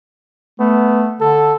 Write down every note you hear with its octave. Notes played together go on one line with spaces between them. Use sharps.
A3 B3
D3 A4